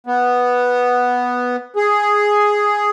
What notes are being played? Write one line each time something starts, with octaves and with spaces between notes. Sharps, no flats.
B3
G#4